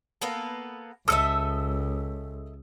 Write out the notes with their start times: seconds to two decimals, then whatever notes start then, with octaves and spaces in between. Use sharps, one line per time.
0.22 A#3 B3 A4
1.08 C#2 A4 D#5 E5 D#6 E6 C#7